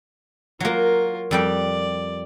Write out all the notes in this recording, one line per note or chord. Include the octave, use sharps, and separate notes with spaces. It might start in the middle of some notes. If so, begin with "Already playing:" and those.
F#3 A#3 F4 A#4
F2 G3 D5 G5